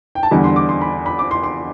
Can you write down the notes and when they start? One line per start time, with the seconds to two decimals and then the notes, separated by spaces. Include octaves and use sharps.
0.15 G5
0.23 A5
0.31 E2 D3 G3 D4 B5
0.44 C6
0.56 D6
0.69 C6
0.81 B5
1.06 B5
1.19 D6
1.31 C6
1.44 C6